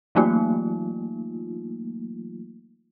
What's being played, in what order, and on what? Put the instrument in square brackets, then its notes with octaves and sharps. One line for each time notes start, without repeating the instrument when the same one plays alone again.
[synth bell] E3 F#3 A3 A#3 D#4 F4